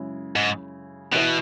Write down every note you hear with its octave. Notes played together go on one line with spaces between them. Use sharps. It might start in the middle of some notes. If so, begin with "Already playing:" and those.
Already playing: F#2 C#3 G#3 E4
G#2
B2 E3 B3 E4 B4 E5